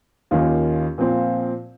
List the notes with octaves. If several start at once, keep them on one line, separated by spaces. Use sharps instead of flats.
D#2 D#3 A#3 C#4 F4
A#2 F3 C4